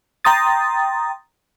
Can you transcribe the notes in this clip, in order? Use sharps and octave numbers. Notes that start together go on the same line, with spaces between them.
G5 A#5 C6 D#6 A6